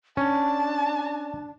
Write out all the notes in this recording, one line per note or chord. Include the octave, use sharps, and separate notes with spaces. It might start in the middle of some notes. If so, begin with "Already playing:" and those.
C#4 D4 A5